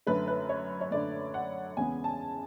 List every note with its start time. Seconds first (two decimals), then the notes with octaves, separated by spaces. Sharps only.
0.07 F#2 D3 A3 B4
0.28 B4
0.49 C#5
0.81 C#5
0.91 F#2 D3 A3 D5
1.34 F#5
1.77 E2 C#3 G#3 B3 G#5
2.04 A5